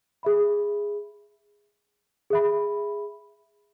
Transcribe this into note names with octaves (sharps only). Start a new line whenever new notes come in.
G#4 E5 B5
G#4 E5 B5